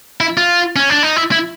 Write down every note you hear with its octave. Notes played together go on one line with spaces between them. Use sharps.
E4
F4
C#4
D4
D#4
E4
E4